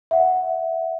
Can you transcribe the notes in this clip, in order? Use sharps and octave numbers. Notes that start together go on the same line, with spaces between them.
E5 F#5